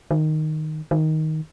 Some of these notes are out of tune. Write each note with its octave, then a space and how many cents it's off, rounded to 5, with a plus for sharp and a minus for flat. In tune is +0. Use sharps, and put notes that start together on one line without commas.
D#3 -5
D#3 +10